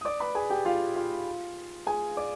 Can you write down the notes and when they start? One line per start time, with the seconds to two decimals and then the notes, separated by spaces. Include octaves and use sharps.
0.01 D#6
0.05 D5 D6
0.20 B4 B5
0.35 G#4 G#5
0.50 G4 G5
0.65 F4 F5
0.95 F4 F5
1.86 G#4 G#5
2.17 D5 D6